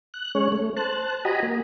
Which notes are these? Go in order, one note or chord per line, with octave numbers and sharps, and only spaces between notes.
F#6
G#3 C#4 C#5
A3
C5 A5 F#6
F#4 G4 D#5 G#5 A#5 B5
A#3